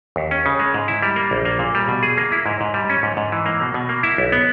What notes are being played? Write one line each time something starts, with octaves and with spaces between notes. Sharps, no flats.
D#2
C#4
C#3
G#3
G#2
E4
G3
A#3
A#1
A#3
A#2
G3
B2
G#4
A#3
E4
G#2
G#2
G3
C#4
G#2
G#2
E3
A#3
B2
B2
A#3
E4
B1
B3